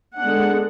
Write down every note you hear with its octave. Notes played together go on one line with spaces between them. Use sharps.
D3 G#3 B3 D4 F#5